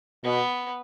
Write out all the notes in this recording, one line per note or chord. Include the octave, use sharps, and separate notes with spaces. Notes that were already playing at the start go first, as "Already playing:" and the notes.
B2 B3